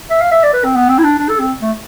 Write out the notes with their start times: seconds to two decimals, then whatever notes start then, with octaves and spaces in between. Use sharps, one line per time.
0.10 E5
0.21 F5
0.31 E5
0.43 D5
0.53 B4
0.64 C4
0.75 B3
0.89 C4
0.98 E4
1.03 D4
1.19 D4
1.29 A4
1.40 C4
1.62 A3